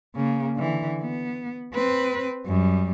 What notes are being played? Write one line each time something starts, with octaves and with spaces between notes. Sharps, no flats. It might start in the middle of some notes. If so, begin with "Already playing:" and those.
C#3 A#3
D3 E3
B3
C4 B4
F#2 G3